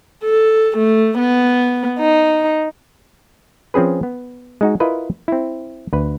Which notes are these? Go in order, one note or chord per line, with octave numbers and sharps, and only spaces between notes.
A4
A3
B3
D#4
F3 C4 C#4 G#4 B4
B3
G#3 D#4 F#4
E4 F4 A#4 B4 D#5
C4 E4
D2 B4